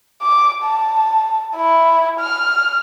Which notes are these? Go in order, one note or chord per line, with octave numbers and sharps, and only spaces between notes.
D6
A5
E4
F6